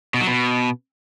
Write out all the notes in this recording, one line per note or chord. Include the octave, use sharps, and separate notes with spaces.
B2
F#3
B2